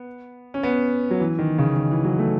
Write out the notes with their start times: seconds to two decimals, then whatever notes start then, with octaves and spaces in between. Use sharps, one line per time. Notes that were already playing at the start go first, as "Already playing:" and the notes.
Already playing: B3
0.54 C#4
0.63 B3
1.11 F#3
1.20 E3
1.39 D#3
1.58 C#3
1.76 D#3
1.91 E3
2.04 F#3
2.19 A3